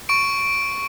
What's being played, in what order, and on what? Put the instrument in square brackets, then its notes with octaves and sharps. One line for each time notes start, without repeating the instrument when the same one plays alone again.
[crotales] C#6 D7